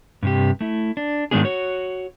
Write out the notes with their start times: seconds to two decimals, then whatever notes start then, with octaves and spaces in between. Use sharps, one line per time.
0.23 G2 C3 G4
0.61 A3 E4
0.97 D4
1.31 G#2 D#3 G#3 B3 D4 G#4
1.44 F#4 C#5